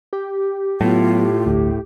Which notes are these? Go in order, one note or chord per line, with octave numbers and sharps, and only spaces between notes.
G4
A2 F#3 B3 F4
G1 D2